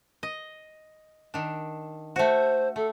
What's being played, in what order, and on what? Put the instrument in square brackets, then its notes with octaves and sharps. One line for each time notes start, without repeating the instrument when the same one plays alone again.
[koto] D#5
D#3 D4
[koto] A3 F#4 [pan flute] C5
[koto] A3 [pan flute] A4